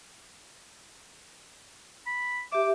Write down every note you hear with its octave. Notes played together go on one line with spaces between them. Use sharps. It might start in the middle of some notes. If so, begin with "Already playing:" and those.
B5
G4 E5 D6